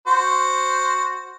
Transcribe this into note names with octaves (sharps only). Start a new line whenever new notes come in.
F#4 C5